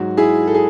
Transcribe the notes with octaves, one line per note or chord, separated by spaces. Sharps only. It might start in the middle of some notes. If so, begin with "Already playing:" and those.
Already playing: G#2 F#3 F#4
E4 G#4
A4
G#4